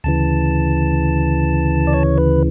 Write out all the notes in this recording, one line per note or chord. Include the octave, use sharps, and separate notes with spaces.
D2 C#3 E3 A5
D5
C#5
B4